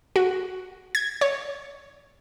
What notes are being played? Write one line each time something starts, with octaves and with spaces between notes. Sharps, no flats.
F#4
G#6
C#5